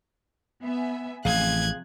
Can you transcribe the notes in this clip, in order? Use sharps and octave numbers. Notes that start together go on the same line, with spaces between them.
B3 E5 G#5
A1 F2 C3 G#4 F5 F#6 G#6